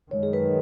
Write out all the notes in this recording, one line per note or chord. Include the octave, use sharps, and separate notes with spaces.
F#2 D#3 G#3 C#5
G#4
B4